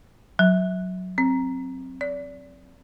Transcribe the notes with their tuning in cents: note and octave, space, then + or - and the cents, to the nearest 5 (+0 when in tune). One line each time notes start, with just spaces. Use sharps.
F#3 -5
C4 +5
D5 -30